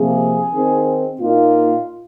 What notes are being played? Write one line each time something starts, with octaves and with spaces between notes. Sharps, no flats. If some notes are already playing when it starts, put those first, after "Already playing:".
Already playing: C3 F3 A#3 G#4
D#3 C4 D#4
A#2 A#3 D#4 F4